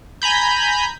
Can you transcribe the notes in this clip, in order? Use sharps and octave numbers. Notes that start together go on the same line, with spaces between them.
G#5 A#5 B5 G6